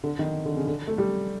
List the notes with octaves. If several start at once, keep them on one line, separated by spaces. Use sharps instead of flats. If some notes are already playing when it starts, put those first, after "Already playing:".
D3
D#3
D3
C#3
D3
A3
G3